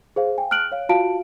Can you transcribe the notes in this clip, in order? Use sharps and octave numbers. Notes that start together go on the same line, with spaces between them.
G#4 C5 F5
G5 G#5
A5 F6 F#6 D7 F#7
C#5 F5
F4 F#4 F5 A5 D7